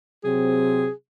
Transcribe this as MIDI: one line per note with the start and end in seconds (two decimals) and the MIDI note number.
0.24 0.86 48
0.24 0.86 54
0.24 0.86 60
0.24 0.91 68